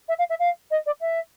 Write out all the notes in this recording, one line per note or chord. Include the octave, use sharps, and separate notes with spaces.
E5
F5
E5
F5
D#5
D5
E5